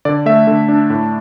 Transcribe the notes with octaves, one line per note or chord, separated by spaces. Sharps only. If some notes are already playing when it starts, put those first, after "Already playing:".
D3 D5
A3 E5
D3
D4
A2